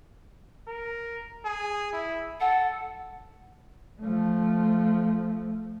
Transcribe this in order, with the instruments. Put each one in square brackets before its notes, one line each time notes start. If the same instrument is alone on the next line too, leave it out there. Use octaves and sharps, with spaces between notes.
[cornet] A#4
G#4
E4
[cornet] A4 [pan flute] F#5
[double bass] F3 A3